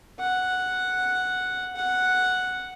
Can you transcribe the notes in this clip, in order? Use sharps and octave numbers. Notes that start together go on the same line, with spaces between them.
F#5
F#5